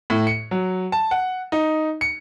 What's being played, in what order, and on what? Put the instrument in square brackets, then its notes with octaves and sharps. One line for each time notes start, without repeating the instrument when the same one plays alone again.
[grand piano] A2
C#7
F#3
A5
F#5
D#4
C#7